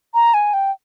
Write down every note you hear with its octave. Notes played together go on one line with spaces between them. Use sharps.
A#5
G#5
G5